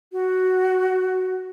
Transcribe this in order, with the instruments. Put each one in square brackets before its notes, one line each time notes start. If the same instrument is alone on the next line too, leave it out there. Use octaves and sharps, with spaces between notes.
[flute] F#4